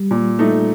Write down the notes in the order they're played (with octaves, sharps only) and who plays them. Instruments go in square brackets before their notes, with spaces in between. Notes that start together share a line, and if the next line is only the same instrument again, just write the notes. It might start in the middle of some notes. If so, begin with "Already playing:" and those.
Already playing: [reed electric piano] G3
[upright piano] A#2
A3 D#4